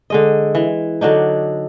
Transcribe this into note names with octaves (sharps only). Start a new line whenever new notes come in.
D3 G#3 D#5
E3
D3 F#3 D4 D#4